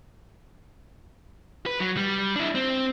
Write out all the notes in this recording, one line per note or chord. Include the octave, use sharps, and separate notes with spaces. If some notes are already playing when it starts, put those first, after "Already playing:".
B4
F#3
G3
D4 E4
C4